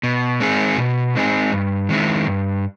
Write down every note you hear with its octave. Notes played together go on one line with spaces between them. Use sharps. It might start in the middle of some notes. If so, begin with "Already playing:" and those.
B2
G#3 C4 D#4 G#4
B2
G#3 C4 D#4 G#4
G2
D#3 G#3 C4 E4
G2